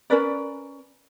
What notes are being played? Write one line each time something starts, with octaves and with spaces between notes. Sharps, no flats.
C#4 A#4 B4 D5